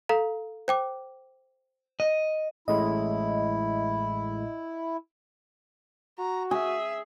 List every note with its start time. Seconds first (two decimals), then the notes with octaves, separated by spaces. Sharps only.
0.09 A4 F5 A#5
0.68 C5 G5 D6
2.00 D#5
2.68 A1 A2 G#3 E4 D#5
6.19 F#4 A#5
6.51 G#4 E5